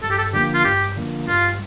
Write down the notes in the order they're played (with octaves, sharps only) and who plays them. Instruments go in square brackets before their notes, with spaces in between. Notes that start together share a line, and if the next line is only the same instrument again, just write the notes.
[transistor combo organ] G2 [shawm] A4
[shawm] G4
A4
[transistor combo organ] D3 F3 A#3 [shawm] G4
[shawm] F4
[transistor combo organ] G2 [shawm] G4
[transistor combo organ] D3 F3 A#3
[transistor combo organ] G2 [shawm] F4